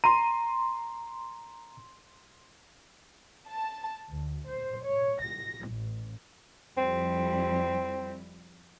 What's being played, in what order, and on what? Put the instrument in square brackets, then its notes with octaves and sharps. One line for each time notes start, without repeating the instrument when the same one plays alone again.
[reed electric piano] A#5 [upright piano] C6 D#7
[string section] A5
D2
C5
C#5
A#6
A1
[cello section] F2 G3 E4 [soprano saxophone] C4